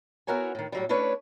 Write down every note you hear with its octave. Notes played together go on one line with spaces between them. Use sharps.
B3 E4 F#4 A#4 C#5 G#5
A2 D#3
A2 F#3 G3
A3 C#4 D4 E4 B4 C#5